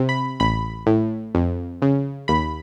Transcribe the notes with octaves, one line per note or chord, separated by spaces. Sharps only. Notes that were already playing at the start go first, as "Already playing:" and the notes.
Already playing: C3
B5
A1 B5
A2
F2
C#3
D#2 B5